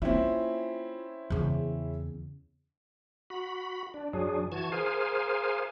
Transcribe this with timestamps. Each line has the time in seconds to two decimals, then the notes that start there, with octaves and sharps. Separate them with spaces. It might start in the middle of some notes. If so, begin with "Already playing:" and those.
0.02 A#3 C4 C#4 E4 F4
1.30 E2 C#3
3.30 F#4 B5
3.94 D4
4.13 F#2 F#3 D4 G#4
4.52 E3 F#4 A5 G#6
4.72 G#4 A#4 C5 F5 G#5